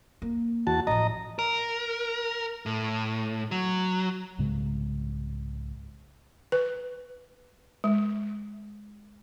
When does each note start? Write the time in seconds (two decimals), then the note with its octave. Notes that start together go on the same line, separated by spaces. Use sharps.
0.22 A#3
0.67 E2 F#4 A5
0.87 A1 F3 D#5 A#5
1.39 A#4
2.66 A2
3.51 F#3
4.38 C2 G#2 C#3 G#3
6.52 B4
7.84 G#3